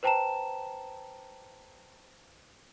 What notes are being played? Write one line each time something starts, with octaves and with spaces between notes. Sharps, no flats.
B4 C5 G5 A5 A#5 E7